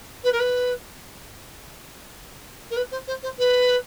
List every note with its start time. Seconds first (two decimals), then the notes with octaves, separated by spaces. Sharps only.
0.24 B4
0.32 A#4
0.40 B4
2.71 A#4
2.76 B4
2.91 C5
3.07 C5
3.23 C5
3.38 B4